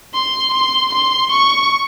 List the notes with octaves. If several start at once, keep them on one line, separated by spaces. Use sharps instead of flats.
C6
C6
C6
C#6